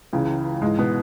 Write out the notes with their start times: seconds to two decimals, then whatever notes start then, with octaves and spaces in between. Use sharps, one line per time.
0.13 C#2 C#3 E3
0.62 G#2 E3 G#3
0.78 B2 B3